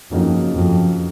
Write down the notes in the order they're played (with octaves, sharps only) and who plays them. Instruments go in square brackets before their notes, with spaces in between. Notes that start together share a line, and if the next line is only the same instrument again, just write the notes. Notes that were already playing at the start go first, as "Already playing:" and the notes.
[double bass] F2 [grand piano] C#3 F#3 A#3 D#4
[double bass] F2